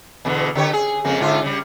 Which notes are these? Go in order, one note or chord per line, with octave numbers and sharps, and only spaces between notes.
E2 B2 D3
D3 G4 C#5
G#4
F2 C#3 A#3
G#2 D3 F4
C#3 G3